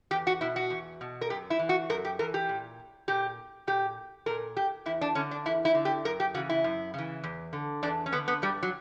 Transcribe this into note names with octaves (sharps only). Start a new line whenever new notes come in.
E2 G4
F#4
B2 E4
F#4
E2
B2
A#4
F#2 G4
E4
E3
F#4
F#2 A#4
G4
E3 A#4
G4
A#2
A#2 G4
A#2 G4
A#2 A#4
G4
E2 E4
D4
D3 C#4
D4
E2 E4
E4
D3
G4
F#2 A#4
G4
C#3 E3 F#4
E4
F#2
C#3 E3
E2
D3
E2 D4
C#4
D3 B3
B3
G2 G3
F#3